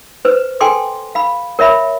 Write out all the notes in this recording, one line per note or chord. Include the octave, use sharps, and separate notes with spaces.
B4 C5
A4 G5 G#5 C6 D6
F5 B5
A#4 C#5 E5 B5